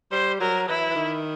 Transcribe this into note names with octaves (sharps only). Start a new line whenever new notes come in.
G3 C5
F#3 A#4
E3 E4
E3
D#3